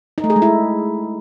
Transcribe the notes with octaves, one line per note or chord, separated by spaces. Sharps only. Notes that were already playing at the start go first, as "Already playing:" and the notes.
D#4
A3
G#4
G#3
E4